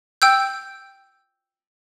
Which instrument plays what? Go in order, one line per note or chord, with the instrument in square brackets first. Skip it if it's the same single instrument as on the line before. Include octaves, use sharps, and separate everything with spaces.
[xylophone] G5 E6 G6